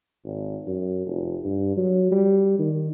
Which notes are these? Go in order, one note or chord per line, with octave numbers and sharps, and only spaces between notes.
G#1
F#2
F1
G2
F#3
G3
D#3